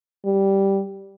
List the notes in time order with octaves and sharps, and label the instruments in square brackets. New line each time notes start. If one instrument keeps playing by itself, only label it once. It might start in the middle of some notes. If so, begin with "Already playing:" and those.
[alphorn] G3